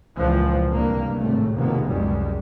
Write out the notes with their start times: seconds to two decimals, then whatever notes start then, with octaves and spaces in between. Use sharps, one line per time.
0.17 C#2 A#2 E3 F3
0.71 C2 G2 A#3
1.19 G#1 A2 C3 A3
1.54 F1 D#2 G#2 B2 A#3 B3
1.86 C#2 F#2 G3 G#3